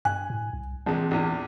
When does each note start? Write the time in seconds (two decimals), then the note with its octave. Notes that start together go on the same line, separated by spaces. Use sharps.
0.05 G2 G#5 F#6
0.30 A2
0.53 C2
0.86 A#1 C3 E3 G#3 A5
1.11 A#1 E2